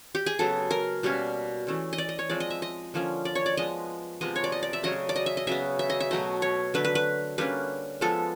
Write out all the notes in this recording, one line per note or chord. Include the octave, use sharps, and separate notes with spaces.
G4
G#4
C#3 F#3 B3 A4
A#4
B2 G3 A#3 C#4
E3 A3 C#4
D#5
D5
D#5
C#5
F3 G#3 C4 D5
D#5
E5
D#5
D3 F3 A#3 C#4
D5
C#5
D5
F3 G#3 B3 D#5
C3 F3 G#3 B3 D#5
C#5
D5
D#5
D5
E5
C#3 F#3 A3 C#4 D#5
D5
D#5
E5
D#5
C#3 F#3 B3 E5
E5
D#5
E5
B2 F#3 A3 D#5
C#5
D3 F#3 A3 B4
B4
B4
D3 G3 A#3 C#4 B4
F3 G#3 B3 A4